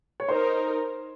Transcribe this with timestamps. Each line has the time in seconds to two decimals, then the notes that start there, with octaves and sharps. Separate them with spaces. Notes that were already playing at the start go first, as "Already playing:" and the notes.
0.20 C#5
0.29 D#4 A#4 C5